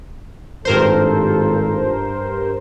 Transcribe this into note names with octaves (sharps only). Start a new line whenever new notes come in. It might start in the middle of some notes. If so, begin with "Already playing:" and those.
G#1 G2 F4 A4 A#4 C5